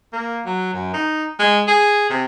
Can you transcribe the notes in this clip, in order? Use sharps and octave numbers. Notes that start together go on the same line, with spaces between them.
A#3
F#3
F#2
D#4
G#3
G#4
C3